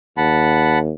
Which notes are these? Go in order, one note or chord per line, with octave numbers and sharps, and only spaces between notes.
D#2 F#5 A5 B5